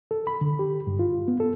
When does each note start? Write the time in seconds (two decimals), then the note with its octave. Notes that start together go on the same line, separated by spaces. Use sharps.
0.11 A4
0.27 B5
0.41 D3
0.59 G4
0.87 G2
0.99 F4
1.28 B3
1.40 A4